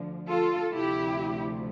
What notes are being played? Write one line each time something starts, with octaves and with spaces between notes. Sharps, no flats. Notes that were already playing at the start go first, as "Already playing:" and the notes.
Already playing: D2 D3 F3
F4 A4
D2 C3 F3 E4 G4